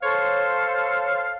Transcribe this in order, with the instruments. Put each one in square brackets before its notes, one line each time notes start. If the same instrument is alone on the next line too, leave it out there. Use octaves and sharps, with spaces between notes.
[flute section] A4 C5 C6 [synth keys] C#5 [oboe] F5